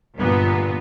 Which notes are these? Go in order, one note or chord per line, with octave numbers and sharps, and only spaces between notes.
G1 A#2 B3